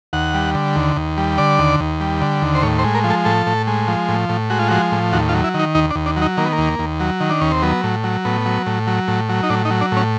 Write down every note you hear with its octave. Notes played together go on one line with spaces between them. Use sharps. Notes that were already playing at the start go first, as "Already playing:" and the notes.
D#2 F#5
G3
D3
D#2
D#2
G3
D3 D5
D#2
D#2
G3
D3
D#2
C5
A2 C#5
C5
G#3
A#4
F3
A4
A2 A4
A2
G#3
F3
A2
A2
G#3 F#4
F4
F3 F#4
A2
D#2 F#4
F4
F#3
E4
D#3
D#4
D#2 D#4
D4
D#2
D4
F#3
D#4
D#3 A#3
B3
A#3
D#2
D#2
F#3
D#3
D4
D#2 C#4
C4
F#3 B3
A2
F#3
A2 B3
F#3
A2
F#3
A2
F#3
D#4
A2 D4
D#4
F#3
D4
A2 C#4